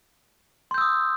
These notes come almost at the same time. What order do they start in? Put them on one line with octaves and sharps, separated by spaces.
C6 G6 E6 D#6